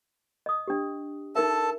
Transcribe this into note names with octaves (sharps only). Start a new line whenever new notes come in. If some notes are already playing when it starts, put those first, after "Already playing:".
D#5 D#6
D4 G4
D#4 A4 A#4 E5 A5